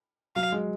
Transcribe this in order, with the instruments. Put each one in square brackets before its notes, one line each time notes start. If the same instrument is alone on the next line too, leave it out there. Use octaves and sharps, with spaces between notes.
[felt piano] F#3 [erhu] F5
[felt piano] G#3